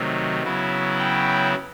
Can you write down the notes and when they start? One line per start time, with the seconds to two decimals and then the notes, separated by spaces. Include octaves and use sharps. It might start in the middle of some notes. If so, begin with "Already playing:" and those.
Already playing: C3 D#3 F#3 A3
0.42 C#3 F#3 B3 E4
0.98 G5